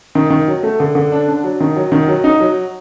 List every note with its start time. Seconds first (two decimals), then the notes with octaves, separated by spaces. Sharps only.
0.15 D#3
0.30 D#3
0.48 F#3
0.63 A3
0.80 D3
0.95 D3
1.12 D4
1.28 D4
1.44 F#3
1.60 D#3
1.76 F#3
1.92 D#3
2.08 F#3
2.24 D#4
2.40 F#3